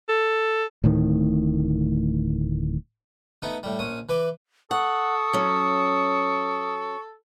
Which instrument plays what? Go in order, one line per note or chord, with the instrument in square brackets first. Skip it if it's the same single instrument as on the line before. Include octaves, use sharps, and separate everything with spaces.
[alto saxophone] A4
[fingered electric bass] D1 A2 D#3
[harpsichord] A3 B3 D#4
A2 G3
A#1 C#4 D#6
E3 B4 D6
[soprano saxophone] A4 [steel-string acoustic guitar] F#5 [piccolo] C#6 [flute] D#6
[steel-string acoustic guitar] F#3 C#4